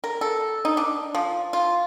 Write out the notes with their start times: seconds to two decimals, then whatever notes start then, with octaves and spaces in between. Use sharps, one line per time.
0.04 A#4
0.21 A4
0.65 D#4
0.77 D4
1.15 F3
1.53 F4